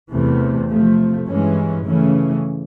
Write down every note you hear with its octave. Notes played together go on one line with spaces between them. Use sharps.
E2 C3 E3 A3
C3 F3 A3
G2 E3 G#3 C#4
C#3 E3 A3 C#4